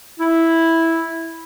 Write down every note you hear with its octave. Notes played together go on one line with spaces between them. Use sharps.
E4